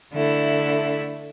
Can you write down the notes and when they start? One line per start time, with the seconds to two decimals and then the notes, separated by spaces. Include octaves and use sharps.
0.13 D3 A3 E4